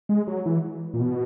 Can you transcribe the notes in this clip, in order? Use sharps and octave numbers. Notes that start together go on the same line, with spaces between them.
G#3
F#3
E3
A#2
B2